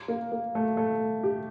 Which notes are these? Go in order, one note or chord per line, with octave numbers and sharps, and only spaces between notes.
A#3
A#3
A3
A3
G4